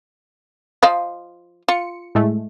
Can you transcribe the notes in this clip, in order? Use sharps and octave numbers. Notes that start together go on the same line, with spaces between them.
F3 D#5 F5
F4 C#7
A2 G#3 A3